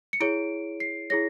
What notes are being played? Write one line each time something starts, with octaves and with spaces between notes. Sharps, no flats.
C#7
E4 G#4 C#5 D7
C7
E4 G#4 C#5 A#6